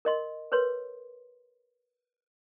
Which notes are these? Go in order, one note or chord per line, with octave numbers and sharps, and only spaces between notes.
A#4 D#5 C6
A#4 B4 C#5 C6